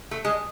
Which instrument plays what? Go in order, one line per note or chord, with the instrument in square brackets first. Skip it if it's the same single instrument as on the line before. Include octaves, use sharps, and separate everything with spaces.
[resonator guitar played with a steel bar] A3
G#3